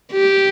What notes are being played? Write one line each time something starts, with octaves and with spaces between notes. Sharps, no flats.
G4